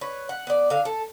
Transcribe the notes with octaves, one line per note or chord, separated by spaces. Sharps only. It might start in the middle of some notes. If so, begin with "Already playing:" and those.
B4 C#5
F#5
B3 D5
D3 F5
A4